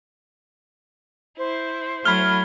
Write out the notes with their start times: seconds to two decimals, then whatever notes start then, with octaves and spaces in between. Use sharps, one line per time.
1.37 E4 C5
2.05 F#3 A3 E4 B5 F6 G#6 G7